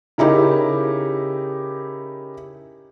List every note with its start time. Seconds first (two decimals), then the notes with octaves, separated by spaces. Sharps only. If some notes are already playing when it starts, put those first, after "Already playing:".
0.18 C#3 D#4 E4 G4 A#4